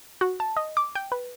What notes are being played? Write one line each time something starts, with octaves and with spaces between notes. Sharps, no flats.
F#4
A5
D#5
D6
G5
B4